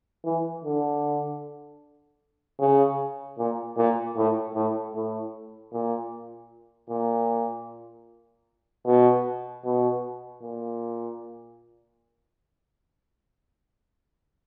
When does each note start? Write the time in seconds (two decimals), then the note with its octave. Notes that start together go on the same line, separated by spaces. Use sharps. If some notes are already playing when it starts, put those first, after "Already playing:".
0.25 E3
0.64 D3
2.60 C#3
3.38 A#2
3.77 A#2
4.17 A2
4.55 A2
4.95 A2
5.73 A#2
6.90 A#2
8.86 B2
9.65 B2
10.42 A#2